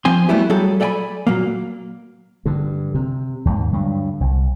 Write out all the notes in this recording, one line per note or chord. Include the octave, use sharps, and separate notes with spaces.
F3 C4 G#5 C6
F#3 G3 A3 B3 E4 G4
F#3 G3 G#4 A4
A4 D5 E5 G5 G#5 B5
A#2 F#3 A#3
G2 D3
C3
D#2 G#2
G2 D3 F#3
C2